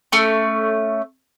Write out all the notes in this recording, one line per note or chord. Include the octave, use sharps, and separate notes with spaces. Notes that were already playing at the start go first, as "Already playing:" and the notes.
A3 C#4 D6